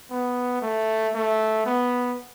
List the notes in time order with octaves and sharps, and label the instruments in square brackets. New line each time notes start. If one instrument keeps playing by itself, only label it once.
[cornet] B3
A3
A3
B3